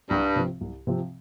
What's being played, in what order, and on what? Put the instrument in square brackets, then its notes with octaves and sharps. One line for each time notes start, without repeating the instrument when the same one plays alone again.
[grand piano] C2 [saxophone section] G2
[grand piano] C3 F3 C4
C2
C3 F3 C4